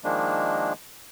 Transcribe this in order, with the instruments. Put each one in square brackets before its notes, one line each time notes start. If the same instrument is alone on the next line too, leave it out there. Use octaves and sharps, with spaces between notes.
[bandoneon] D#3 F3 G#3 A#3 D4